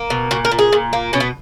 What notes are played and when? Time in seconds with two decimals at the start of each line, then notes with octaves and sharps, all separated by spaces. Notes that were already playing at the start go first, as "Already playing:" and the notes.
Already playing: A#3
0.10 B2
0.31 A#2 F#4
0.45 A#4
0.51 A#2
0.59 G#4
0.72 A#2
0.93 A#3
1.13 B2 C#4
1.20 B3